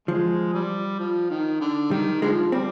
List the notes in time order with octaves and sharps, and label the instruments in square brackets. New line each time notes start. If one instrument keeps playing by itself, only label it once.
[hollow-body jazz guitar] F3 [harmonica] G#3
[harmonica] G3
F3
D#3
D3
[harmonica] D#3 [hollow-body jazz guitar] G3
[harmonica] D3 F3 [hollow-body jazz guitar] G#3
[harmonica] G3 [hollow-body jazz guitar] C4